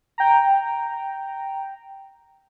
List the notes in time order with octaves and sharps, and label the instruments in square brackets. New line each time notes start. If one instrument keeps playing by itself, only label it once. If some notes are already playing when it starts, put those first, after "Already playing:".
[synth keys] G5 A#5